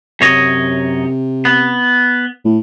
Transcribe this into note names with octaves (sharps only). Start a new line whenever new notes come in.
F#2 C3 C#5 D#5
B3
A2